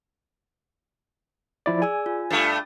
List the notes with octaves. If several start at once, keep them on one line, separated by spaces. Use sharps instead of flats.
F3 E4 D5
G#4 D5 G#5 E6
F4
G2 A3 A6